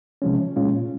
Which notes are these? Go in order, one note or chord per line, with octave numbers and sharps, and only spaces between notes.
C3 F3 G#3 C#4
A#2 G#3 C#4 F4